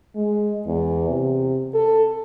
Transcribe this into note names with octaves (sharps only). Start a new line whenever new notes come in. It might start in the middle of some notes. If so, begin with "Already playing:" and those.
G#3
E2
C3
A4